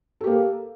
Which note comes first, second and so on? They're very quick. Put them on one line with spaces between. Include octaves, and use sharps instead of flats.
A4 G4 A#3